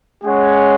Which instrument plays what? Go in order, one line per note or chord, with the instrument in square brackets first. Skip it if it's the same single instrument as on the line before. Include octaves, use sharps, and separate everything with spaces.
[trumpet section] G#3 C#4 G#4 C#5 F#5